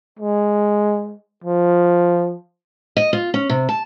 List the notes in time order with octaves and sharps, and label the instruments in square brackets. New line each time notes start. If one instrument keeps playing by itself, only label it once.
[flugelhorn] G#3
F3
[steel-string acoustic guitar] D#5
F4
C#4
C3
A5